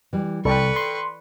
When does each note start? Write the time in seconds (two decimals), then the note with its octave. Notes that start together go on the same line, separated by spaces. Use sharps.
0.13 E3 G3
0.45 C2 A4 B4 D5 G5 C#6
0.76 C6